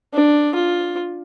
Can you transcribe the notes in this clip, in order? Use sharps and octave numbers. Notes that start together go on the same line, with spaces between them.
D4
F4